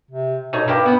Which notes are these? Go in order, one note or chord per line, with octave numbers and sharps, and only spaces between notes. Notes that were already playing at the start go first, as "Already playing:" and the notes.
C3
B2 A3 D#4 C#5
G2 A#3 E4 G4
B3 F#4